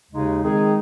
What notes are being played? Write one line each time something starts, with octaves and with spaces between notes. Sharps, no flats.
D#2 C#3 G#3 D#4
D#3 G#3 C4 D#4 G#4